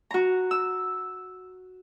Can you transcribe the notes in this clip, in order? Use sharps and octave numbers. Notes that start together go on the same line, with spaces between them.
F#4 A#5
E6